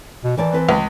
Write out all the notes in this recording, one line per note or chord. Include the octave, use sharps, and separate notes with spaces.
B2
D#3 E3 D5 A5
C4 B4 A5
C#2